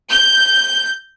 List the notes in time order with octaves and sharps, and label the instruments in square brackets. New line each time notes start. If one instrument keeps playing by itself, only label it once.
[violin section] G6